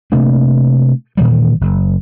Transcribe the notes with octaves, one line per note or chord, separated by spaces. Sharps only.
C3 A3 A#3 D4
A#2 D#3 E3 G3
F#1